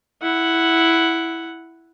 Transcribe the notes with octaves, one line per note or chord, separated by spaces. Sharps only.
E4 F#5